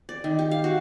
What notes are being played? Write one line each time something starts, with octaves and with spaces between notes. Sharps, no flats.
D5
D#3
G4
F5
F#4